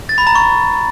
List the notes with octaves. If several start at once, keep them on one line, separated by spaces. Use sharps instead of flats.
A6
B5
A#5
C#6